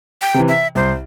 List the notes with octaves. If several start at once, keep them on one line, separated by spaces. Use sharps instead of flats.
G5
C3 E3
E5
C2 C5